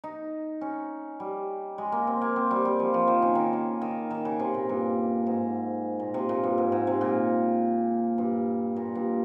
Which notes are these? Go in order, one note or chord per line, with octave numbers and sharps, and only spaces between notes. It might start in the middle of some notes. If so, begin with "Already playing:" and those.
D#4
C#4
G3
G#3
A#3
C4
A#3
C4
G3
G3
F3
F3
D#3
C#3
D#3
C#3
D#3
D#3
C#3
C3
A#2
G2
G#2
A#2
C3
A#2
G2
G#2
G#2
C3
A#2
G2
A#2
G2